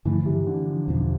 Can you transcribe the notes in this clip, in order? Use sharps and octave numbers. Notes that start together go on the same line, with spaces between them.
G2 D3 E3 F3 A3
C3
D3
F3
E2 B2 F3 B3 D4